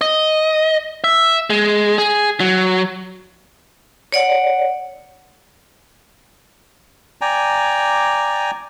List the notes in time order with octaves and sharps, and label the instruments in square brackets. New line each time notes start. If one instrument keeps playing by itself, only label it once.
[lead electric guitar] D#5
E5
G#3
G#4
F#3
[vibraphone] C#5 D5 F#5
[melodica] D5 G5 G#5 A#5